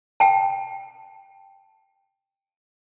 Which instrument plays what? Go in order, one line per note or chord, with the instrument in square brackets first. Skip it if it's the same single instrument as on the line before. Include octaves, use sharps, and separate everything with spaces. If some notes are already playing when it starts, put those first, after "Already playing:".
[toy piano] G5 A5